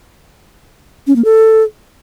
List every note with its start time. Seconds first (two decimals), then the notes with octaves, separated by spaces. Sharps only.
1.07 C#4
1.16 A#3
1.25 A4